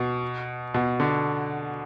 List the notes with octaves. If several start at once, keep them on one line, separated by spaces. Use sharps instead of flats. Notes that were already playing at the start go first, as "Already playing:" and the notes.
Already playing: B2
B2
D3